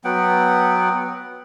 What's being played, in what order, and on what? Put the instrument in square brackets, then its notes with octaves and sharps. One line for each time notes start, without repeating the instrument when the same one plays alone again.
[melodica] F#3 B3 F#5 G5